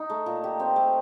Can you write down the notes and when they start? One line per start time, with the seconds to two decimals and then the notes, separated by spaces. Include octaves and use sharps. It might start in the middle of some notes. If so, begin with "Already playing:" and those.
Already playing: D#4
0.10 A3
0.26 A#2
0.44 G4
0.60 C4
0.76 A3